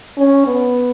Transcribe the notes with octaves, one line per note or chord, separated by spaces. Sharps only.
C#4
B3